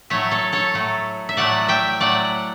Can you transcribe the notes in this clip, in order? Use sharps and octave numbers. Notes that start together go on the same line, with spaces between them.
A2 F#3 A3 C#5 E5
A4 C#5
A4 C#5
A2 F#3 A3
E5
A2 F#3 A3 D5 F#5
E5 G5
A2 F#3 A3 D5 F#5